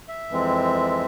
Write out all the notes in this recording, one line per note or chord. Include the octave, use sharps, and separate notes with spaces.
E5
F2 E3 G#3 C4